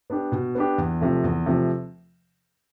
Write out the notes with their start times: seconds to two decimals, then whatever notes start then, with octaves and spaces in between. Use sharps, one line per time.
0.10 B3 D4 G4
0.32 B2
0.55 B3 D4 G4
0.78 E2
1.01 C3 F3 A3
1.24 E2
1.46 C3 F3 A3